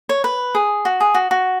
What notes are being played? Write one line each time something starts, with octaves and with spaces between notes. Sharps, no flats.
C#5
B4
G#4
F#4
G#4
F#4
F#4